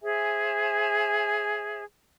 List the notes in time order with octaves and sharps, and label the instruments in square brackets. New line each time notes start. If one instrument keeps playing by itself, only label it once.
[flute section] G#4 C5 E5 G#5